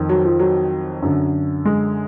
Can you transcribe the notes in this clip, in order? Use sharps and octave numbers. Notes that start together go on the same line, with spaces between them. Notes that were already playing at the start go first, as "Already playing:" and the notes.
Already playing: F2 D#3
F#3
F3
F#3
F#2 D3
G#3